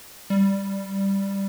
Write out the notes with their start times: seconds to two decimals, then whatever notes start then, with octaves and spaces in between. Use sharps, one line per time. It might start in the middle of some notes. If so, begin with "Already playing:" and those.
0.30 G3